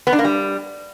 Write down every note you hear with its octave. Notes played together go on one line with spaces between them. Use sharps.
B3
D4
A#3
G3